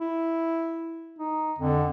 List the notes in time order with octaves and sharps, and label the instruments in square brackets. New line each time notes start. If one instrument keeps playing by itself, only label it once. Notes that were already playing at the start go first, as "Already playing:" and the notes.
[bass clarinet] E4
D#4
[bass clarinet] F2 [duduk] D3